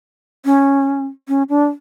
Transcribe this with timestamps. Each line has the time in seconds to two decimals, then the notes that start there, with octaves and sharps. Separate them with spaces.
0.45 C#4
1.28 C#4
1.49 D4